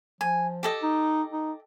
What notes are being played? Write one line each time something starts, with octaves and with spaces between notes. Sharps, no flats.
F3 G#5
G4 A4 D#5
D#4
D#4